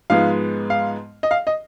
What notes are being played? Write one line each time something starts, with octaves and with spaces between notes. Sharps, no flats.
G#2 F3 G#3 B3 F5
F5
D#5
F5
D#5